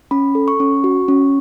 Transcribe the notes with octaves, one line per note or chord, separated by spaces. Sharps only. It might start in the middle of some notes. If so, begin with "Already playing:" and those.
C#4 B5
A4
C#6
C#4
F#4
C#4